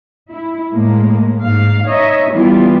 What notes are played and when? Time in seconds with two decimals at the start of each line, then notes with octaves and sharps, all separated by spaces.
0.30 E4
0.71 A2 G#3 A#3
1.42 G#2 F5
1.87 D#4 C#5 D#5 E5
2.32 E3 G3 B3 E4 F4